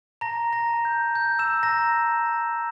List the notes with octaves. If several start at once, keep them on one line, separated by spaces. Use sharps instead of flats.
A5 A#5 A#6
A#5 A#6
A5
G6
G6
E6 E7
A5 A#5 A#6